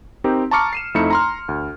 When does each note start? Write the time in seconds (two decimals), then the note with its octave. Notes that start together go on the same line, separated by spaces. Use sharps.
0.24 C4 D#4 G4 A#4
0.51 A5 A#5 C#6 D6 F6 C#7
0.73 C7 D#7 E7
0.95 F2 A3 D#4 E4 C#7
1.10 A#5 C6 F6
1.48 D2